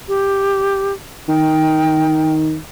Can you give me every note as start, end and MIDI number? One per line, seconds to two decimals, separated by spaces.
0.08 0.93 67
1.29 2.57 51
1.29 2.33 79